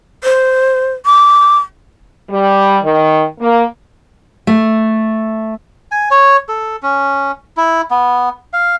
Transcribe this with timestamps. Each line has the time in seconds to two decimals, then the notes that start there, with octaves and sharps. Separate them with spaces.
0.24 C5
1.06 D6
2.31 G3
2.83 D#3
3.40 A#3
4.47 A3
5.91 G#5
6.11 C#5
6.49 A4
6.83 C#4
7.57 E4
7.91 B3
8.53 F5